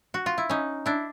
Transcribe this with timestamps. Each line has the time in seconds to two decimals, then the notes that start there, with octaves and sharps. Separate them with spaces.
0.14 F#4
0.26 F4
0.38 E4
0.50 C#4 D#4
0.86 D4 E4